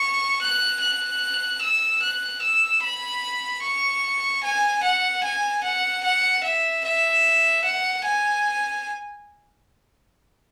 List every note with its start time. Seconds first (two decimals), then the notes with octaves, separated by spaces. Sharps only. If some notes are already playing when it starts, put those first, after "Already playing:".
Already playing: C#6
0.42 F#6
0.82 F#6
1.62 E6
2.02 F#6
2.43 E6
2.83 B5
3.63 C#6
4.44 G#5
4.83 F#5
5.24 G#5
5.63 F#5
6.04 F#5
6.44 E5
6.85 E5
7.64 F#5
8.05 G#5